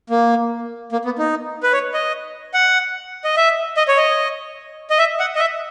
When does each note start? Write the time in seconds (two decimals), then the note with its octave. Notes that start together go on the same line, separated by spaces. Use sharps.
0.10 A#3
0.92 A#3
1.05 B3
1.19 D#4
1.63 B4
1.73 C#5
1.94 D#5
2.54 F#5
3.25 D#5
3.37 E5
3.77 D#5
3.88 C#5
3.97 D#5
4.90 D#5
4.98 E5
5.20 F#5
5.36 D#5
5.39 E5